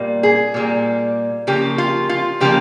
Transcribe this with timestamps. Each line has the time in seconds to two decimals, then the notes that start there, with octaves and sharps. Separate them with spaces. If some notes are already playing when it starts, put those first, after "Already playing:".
Already playing: A#2 G3 A#3
0.23 G#4
0.54 A#2 G3 A#3
1.47 C#3 F3 A#3 G4
1.78 F4
2.09 F4
2.41 C#3 F3 A#3 G4